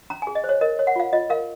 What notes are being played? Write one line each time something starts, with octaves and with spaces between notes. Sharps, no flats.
C#4 A#5
G#4 G#5
D#5
C5
C#5
A#4 D#5
C#5
F#5
F4 F5
F4 D#5
A#4 F5